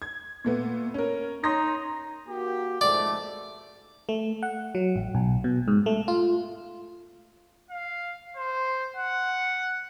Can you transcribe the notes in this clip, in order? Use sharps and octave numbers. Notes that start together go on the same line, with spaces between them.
G#6
A#2 A3 B3
C#4 A#4
D#4 C#5 C6 A#6
A#3 F#4 G4
F2 G#2 A3 D5
A3
F#5
F#3
A1
B1
B2
G#2
A3
F4
F5
C5
F#5